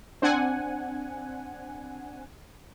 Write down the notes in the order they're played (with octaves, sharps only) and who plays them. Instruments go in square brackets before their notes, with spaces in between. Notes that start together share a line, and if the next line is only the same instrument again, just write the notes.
[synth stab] C4 D4 F#5 G#5